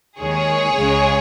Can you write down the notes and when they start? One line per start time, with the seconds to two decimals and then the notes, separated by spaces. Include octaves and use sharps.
0.20 D#2 D#3 G#3 G#4 C#5
0.77 C#2 C#3 G#3